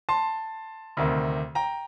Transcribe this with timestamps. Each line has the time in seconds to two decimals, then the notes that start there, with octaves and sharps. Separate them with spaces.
0.09 A5 C6
0.97 D2 C3 D#3
1.55 G5 A#5